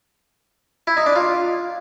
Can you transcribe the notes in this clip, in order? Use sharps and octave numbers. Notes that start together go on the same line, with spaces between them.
E4
D#4
D4
F4